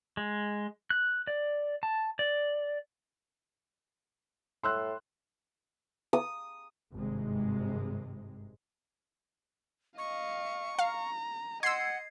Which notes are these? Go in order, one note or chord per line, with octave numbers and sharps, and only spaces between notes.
G#3
F#6
D5
A5
D5
A2 C6 E6 F#6
D#6
G#1 G2 C3 G#3
D#5 F5 C#6
F5 A#5
D#5 F#5 C6 E6 G#6 C7